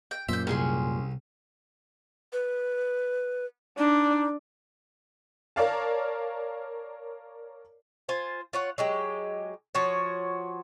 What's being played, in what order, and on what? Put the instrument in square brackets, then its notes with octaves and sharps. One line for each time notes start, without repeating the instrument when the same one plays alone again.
[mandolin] G5
[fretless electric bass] F#2 A#2 [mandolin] C5 G6 [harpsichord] E5
[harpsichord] C2 [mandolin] C#4 G#4 C6
[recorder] B4
[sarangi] D4 [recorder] D#4
[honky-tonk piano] A#4 C#5 D5 F5 A5
[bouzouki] F4 C5 G#5
F4 C#5 F#5
F#3 G#3 G4
F3 F#4 C#5